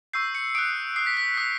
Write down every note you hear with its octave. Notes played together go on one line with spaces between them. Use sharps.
C#6 E6 G6 C7
C#7
D#6 F#6 D7
D#6 F#6 C7
B6
B6
D#6 F#6 B6